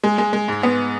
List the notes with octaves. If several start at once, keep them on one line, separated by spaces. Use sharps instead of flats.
G#3
G#3
G#3
G#2
B3